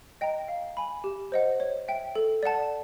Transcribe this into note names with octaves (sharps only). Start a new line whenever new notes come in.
D#5 G5 A#5
F5
G#5 B5
G4
C5 D#5 F#5
C#5
E5 G5
A4
D5 F#5 A5